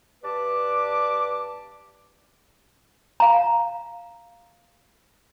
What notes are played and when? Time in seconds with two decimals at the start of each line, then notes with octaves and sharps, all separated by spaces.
0.23 G2 G3 B4 A5 D6
3.20 F5 A#5